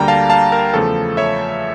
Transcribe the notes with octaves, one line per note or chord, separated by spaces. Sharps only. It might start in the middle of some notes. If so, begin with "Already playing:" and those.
Already playing: D2 D3 G3 A#3 G5 A#5
F5 A5
F5 A5
A#4
E2 C#3 F3 A3 A4
C#5 E5